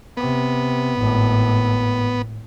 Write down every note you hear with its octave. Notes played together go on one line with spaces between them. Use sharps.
C3 B3
G#1 A2